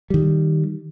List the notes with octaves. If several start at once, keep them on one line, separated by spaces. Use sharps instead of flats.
D#3 G3